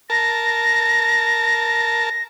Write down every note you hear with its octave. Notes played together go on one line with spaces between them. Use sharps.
A#4 A5 A#6